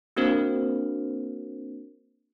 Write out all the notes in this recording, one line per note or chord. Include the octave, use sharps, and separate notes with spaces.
A#3 C4 D4 F#4 A#4 C5